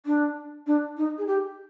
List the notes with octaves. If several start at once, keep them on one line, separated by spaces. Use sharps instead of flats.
D4
D4
D#4
G#4
G4